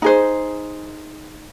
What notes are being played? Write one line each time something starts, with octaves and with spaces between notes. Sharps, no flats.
D#4 G#4 C5